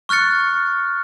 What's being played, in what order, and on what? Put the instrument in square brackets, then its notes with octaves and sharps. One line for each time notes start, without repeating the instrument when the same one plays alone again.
[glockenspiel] C#6 F6 F#6 A6 C#7